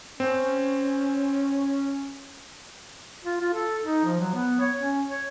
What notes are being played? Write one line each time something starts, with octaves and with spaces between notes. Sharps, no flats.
C4 C#4
F4
F4
A4
D#4
F3
F#3
B3
C#5
C#4
C#5